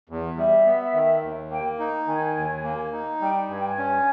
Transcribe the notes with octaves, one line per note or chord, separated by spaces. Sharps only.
E2
G3 E5
B3
D#3
D#2
A#3 G5
D#4
D#3 G#5
D#2
A#3
D#4
G3 G5
G2 G#5
G5
G#5
C#4